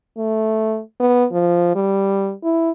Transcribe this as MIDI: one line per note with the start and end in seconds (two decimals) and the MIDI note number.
0.18 0.81 57
1.00 1.26 59
1.32 1.71 53
1.76 2.33 55
2.44 2.71 64